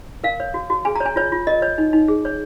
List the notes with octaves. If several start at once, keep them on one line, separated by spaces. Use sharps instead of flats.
A#4 F5
C#5
F#4
F#4
G#4 G#5
A#5
C#5
G#5
F4 C#5
F4
A#4 D#5
C#5
D#4
D#4
G#4
C#5